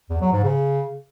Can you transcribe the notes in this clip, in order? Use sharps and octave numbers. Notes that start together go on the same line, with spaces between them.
E2
F#3
G#2
C#3